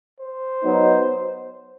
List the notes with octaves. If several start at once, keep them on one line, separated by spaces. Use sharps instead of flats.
C5
F#3 B3 D#4